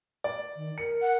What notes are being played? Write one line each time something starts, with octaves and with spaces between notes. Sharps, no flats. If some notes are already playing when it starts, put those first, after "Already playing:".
D5
D#3
A#4 C#7
F#5